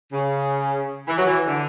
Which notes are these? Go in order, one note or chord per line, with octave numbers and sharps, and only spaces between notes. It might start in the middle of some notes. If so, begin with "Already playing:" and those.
C#3
E3
F#3
E3
D3